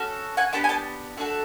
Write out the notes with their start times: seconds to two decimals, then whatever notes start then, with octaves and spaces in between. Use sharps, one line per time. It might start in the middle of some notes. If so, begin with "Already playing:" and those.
Already playing: C#4 F#4 A4
0.37 F#5 G#5
0.53 B3 D4 G4 G5 A5
0.64 G#5
0.69 G5 A5
1.17 A3 D4 F#4 A4